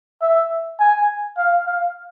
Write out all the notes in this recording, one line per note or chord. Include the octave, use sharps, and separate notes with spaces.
E5
G#5
F5
F5